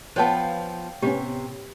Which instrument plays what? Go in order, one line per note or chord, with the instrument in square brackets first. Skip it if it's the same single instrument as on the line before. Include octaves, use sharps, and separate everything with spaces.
[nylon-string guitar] F3 B3 [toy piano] C5 C#5 A5 [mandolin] F5 G5
[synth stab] A2 B3 C#4 [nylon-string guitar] C3 [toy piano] G4